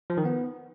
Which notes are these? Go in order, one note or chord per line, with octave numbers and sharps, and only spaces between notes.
F3
D#3
B3